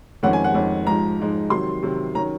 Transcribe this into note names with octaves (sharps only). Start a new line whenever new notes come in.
F2 D#3 G#3 C#4 F#5
G#5
F#5
F2 D#3 G#3 C#4
G#2 F3 G#3 D#4 A#5
G#2 F3 G#3 D#4
C3 D#3 F#3 C6
C3 D#3 F#3
D#3 F#3 C#4 A#5